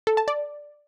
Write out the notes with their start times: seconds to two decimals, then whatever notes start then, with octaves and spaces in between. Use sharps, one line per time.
0.07 A4
0.17 A5
0.28 D5